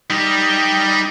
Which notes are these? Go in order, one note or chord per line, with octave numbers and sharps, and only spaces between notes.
G3 D#4 G4